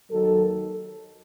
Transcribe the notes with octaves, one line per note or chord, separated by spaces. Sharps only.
D#2 D#3 F#3 A4